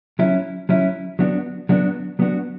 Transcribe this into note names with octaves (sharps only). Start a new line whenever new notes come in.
F#3 C#4 E4
F#3 C#4 E4
F#3 B3 D4 F#4
F#3 B3 D4 F#4
F#3 B3 D4 F#4